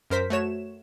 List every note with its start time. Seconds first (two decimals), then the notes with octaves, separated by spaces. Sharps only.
0.10 F#2 A#4 C5 B6
0.30 A3 F#4 C#5 E7